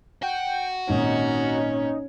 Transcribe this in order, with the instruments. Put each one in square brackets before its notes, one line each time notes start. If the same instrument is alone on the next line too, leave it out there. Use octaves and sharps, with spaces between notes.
[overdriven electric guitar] F#4 [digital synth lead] G5
[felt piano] G#1 A#2 [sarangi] C#4 [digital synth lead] D#4